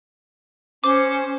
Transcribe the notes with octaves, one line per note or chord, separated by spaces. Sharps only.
C#4 C5 D6